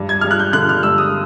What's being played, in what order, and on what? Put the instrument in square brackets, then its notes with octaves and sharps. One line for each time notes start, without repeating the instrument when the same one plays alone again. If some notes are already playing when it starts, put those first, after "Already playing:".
Already playing: [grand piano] G2
G#6
G2 F6
F#6
G6
D3 F#6
F6
G2 E6
D#6